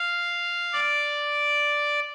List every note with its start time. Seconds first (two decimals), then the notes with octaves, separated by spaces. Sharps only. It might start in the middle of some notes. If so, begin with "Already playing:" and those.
Already playing: F5
0.73 D5